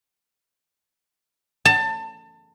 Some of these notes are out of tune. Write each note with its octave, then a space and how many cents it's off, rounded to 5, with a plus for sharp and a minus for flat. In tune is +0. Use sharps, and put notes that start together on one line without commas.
A5 +25